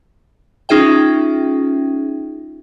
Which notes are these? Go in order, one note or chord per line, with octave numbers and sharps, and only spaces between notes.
C#4 D#4 F4 G#4 E5 G5